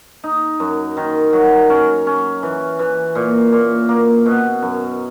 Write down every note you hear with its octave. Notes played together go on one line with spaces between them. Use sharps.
D#4
F#2
D#3
F#3
C#4
C#4
E3
E3
A#2
A#2
A#3
B2
F#2